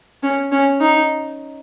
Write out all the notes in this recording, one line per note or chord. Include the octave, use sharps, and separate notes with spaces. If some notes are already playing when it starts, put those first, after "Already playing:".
C#4
C#4
D#4